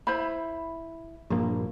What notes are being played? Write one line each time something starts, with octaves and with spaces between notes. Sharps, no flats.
E4 C5 B5
A#1 G2 A#3